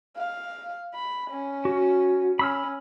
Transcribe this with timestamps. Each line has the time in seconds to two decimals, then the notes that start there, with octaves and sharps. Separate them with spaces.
0.18 F5
0.95 B5
1.31 C#4
1.65 F#4
2.39 C#4 B5 E6 F6